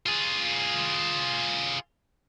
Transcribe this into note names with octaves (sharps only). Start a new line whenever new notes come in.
F4 G#4